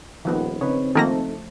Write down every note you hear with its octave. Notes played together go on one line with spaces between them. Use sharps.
D#1 D#3 F3 B3
C#3 C4 D#4 B4 C#5
D#3 F3 A3 A#3 D#4 A4 A#6